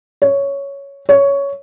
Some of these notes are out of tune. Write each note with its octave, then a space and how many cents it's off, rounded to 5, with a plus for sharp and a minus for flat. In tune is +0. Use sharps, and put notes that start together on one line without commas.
C#5 +5
C#5 +10